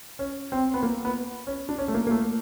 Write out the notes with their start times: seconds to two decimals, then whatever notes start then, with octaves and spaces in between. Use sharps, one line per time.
0.19 C#4
0.52 C4
0.74 B3
0.83 A#3
1.05 B3
1.47 C#4
1.69 D4
1.78 C#4
1.88 A3
1.94 A#3
2.07 A#3
2.11 A3